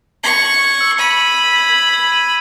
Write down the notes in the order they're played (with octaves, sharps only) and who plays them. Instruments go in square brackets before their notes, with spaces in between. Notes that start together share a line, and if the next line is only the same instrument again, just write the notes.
[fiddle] C#6 [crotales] G#6
[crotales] F#7
G#6
E6
[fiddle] B5 [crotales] D#7
[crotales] D#7
E6
G#6
F#7
G#6
D#7